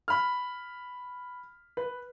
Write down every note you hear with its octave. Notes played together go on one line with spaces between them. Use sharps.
B5 F6
B4